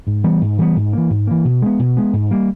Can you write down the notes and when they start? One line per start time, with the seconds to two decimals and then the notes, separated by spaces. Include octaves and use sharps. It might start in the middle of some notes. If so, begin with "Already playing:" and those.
0.07 G#2
0.24 E3 G3 B3
0.41 G#2
0.58 E3 G3 B3
0.76 G#2
0.93 E3 A#3
1.10 G#2
1.27 E3 A#3
1.45 B2
1.62 G#3 B3
1.79 B2
1.97 G#3 B3
2.13 G#2
2.31 G3 A#3